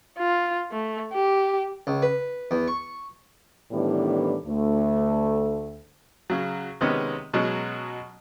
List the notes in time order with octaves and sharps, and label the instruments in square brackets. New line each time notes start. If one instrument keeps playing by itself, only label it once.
[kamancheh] F4
A3
G4
[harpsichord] C#2
B4
E2
C#6
[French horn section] A2 D#3 E3 G3 B3 D4
D2 A3
[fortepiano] C#3 F#3
C3 D#3 G#3 B3 C#4
B2 F#3 G#3 C#4